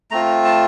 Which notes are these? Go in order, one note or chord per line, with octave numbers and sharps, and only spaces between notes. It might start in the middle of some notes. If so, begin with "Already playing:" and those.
A3 C4 F4 A#5
A5